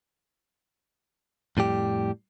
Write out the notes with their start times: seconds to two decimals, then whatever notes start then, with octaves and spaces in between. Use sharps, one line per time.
1.57 F2 A2 G3 G4